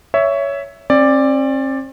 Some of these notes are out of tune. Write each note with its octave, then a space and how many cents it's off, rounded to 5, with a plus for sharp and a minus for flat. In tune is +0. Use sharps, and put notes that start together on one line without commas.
C#5 +15 E5 +0
C4 +45 D5 +5